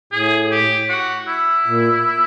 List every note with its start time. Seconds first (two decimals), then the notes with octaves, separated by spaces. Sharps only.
0.12 A2 G#4
0.51 G4
0.89 F#4
1.27 E4
1.66 A#2